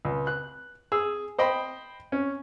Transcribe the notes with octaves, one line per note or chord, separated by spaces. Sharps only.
C#2
F#6
G#4 E6
C5 D#5 G5 B5
C#4